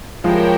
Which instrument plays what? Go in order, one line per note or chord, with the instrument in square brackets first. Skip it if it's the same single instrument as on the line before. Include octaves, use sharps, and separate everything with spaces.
[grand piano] F3 G#3 [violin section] E4 G4 A#4 C#5 G5